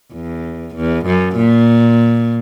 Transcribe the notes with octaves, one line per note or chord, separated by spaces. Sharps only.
E2
E2
F#2
A#2